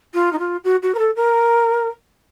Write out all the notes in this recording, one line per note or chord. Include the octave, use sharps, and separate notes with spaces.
F4
D#4
F4
F#4
F#4
A#4
A4
A#4